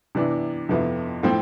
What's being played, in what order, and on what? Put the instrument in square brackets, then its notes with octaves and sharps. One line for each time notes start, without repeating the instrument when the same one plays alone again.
[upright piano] C3 E3 B3 D4
F2 C3 F3 B3 E4
A2 F3 C4